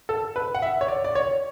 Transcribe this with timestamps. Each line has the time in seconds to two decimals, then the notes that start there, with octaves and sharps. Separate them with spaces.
0.09 A4
0.36 B4
0.55 F#5
0.62 E5
0.81 C#5
0.88 D5
1.04 D5
1.15 C#5